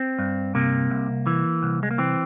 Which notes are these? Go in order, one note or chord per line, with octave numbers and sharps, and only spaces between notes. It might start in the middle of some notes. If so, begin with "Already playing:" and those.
Already playing: C4
G2
C3 A#3
C2
E3
C2
G#3
A#3
E3 C4